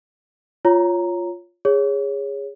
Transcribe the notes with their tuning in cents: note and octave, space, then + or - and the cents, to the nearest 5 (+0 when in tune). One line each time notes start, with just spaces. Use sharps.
F4 +0 C#5 +0 A#5 +0
G#4 -20 C#5 +0